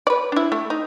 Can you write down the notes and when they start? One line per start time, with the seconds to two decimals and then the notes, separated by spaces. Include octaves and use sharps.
0.07 B4 D5
0.32 D4 E4
0.52 A3
0.70 D#4